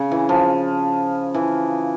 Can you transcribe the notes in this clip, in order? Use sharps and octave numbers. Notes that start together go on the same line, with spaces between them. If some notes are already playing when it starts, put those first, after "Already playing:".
Already playing: C#3
E3
F3
E3